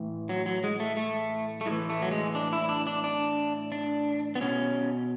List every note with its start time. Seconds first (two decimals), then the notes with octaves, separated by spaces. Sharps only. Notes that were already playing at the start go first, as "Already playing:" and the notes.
Already playing: A2 E3
0.29 F#3
0.46 F#3
0.64 G#3
0.80 A3
0.97 A3
1.61 A3
1.66 A2 G#3
1.71 E3
1.90 A3
2.02 F#3
2.11 G#3
2.35 D4
2.53 E4
2.69 D4
2.87 D4
3.04 D4
3.72 D4
4.35 B3
4.41 B2 C#4